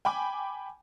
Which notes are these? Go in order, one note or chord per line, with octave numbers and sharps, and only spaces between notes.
G5 G#5 B5 D6